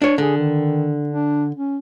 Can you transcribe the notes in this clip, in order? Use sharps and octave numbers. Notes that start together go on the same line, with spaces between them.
D4 C#5
D3 G#4
D#3
D4
C#4